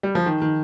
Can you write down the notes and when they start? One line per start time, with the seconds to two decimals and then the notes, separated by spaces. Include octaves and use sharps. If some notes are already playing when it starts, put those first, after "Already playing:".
0.03 G3
0.15 F3
0.26 D#3
0.42 D#3